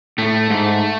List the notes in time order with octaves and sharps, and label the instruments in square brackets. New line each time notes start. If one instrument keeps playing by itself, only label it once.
[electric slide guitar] A2 [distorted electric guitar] A3
[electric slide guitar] G#2